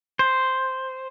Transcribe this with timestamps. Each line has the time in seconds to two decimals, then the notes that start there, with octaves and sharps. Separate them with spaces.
0.19 C5